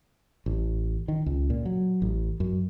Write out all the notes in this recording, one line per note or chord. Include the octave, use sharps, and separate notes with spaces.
A1
D#3
C#2
A#2
F#3
A1
F#2